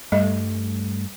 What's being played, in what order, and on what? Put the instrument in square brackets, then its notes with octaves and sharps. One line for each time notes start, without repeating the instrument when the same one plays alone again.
[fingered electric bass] G2 A3 [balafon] G3 D#5